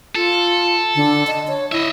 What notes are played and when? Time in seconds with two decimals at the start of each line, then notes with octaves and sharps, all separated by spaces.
0.15 F4 A4
0.96 D3
1.27 D#5
1.48 C#5
1.72 E4 D#5 E5